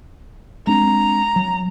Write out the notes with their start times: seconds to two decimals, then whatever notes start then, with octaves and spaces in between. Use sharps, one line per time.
0.67 G#3 C4 D4 A#5
1.36 F#3